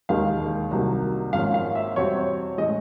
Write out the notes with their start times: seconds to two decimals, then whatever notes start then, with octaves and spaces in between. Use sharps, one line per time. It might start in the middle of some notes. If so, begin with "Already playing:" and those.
0.09 E1 D#2 D#3 G#3 F5
0.71 C2 C3 D#3 F#3 A#3
1.33 G#1 G#2 F3 A#3 C#4 F5
1.54 F5
1.75 E5
1.96 E2 B2 G3 C4 C#5
2.17 C#5
2.58 A2 E3 G#3 C#4 D#5